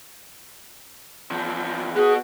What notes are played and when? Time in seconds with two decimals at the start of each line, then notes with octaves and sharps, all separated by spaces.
1.31 E2 F3
1.96 B3 F#4 G#4